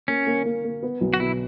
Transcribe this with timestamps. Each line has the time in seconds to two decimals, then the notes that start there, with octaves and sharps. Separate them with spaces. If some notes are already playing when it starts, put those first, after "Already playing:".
0.08 A#3 C#4
0.27 A#3
0.46 A#3
0.65 A#3
0.83 B3
1.01 B1
1.14 F#4
1.20 B2 E4